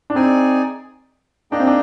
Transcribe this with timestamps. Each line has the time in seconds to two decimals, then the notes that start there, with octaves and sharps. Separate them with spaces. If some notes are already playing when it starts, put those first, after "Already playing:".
0.10 D4
0.15 C4 D#4 G#4 D5 G#5
1.51 A#3 D4 D#4 G#4 D#5 G5
1.60 C4
1.67 D4